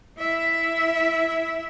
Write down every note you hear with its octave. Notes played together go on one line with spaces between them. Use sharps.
E4 E5